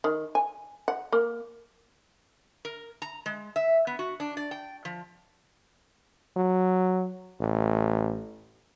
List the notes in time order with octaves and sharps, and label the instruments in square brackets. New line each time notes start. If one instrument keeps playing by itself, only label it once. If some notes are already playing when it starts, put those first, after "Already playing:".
[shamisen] D#3
G#5
F#5
A#3
[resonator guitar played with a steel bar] A#4
A#5
G#3
E5
B3
F#4
D4
D5
G5
F3
[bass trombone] F#3
A1